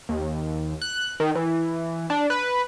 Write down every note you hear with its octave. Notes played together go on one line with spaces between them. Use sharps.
D#2
F#6
D#3
E3
D4
B4